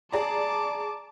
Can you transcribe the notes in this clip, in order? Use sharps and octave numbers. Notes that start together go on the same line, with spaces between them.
G#4 D5 A5 A#5 D6